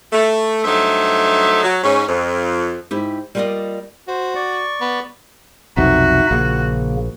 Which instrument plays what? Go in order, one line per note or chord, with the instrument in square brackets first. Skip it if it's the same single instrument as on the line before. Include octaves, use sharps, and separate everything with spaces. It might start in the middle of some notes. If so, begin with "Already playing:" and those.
[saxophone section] A3
G2 F#3 A3 D#4 C5 E5
F#3
G#2 C#4
F2
[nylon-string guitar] G#2 E4 G4
G3 A#3 F4 A#4 D5 D#5
[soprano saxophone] F#4 [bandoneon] C5
[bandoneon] D5 C#6
[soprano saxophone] B3
[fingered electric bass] B1 F2 C3 [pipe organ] D#4 E5 [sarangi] F#4
[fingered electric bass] A#1 [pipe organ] C#3 A#3